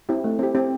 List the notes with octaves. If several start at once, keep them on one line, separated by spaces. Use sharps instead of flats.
C4 E4 G4
A3
C4 E4 G4
C4 G4